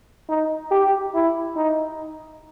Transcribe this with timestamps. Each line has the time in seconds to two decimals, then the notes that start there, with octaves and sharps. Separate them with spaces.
0.29 D#4
0.71 G4
1.14 E4
1.56 D#4